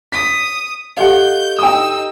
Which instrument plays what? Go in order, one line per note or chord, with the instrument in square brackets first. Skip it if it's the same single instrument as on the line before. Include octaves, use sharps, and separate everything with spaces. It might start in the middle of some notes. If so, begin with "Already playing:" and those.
[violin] D#6 [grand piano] B6
[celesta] G4 A4 D#5 [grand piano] F5 F#5 [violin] G6
[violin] D#4 E6 [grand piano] G5 D#6